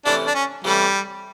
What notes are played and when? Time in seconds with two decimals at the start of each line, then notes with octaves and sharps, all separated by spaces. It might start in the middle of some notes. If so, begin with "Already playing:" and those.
0.05 C3 E3 A3 C#4 D4 E4
0.27 D4
0.35 C#4
0.64 C3 E3 G3 A3 C#4 E4